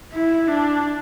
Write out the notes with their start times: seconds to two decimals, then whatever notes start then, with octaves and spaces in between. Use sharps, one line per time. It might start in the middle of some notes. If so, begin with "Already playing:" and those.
0.13 E4
0.47 D4